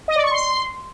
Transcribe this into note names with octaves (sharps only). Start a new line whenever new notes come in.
D#5
D5
C#6
C6